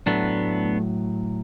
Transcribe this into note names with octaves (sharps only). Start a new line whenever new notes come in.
A2 F#3 A3 B3 D4